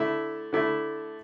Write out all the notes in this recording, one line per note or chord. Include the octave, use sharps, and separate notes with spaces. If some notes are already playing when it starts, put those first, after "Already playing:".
Already playing: D3 A3 E4
D3 A3 E4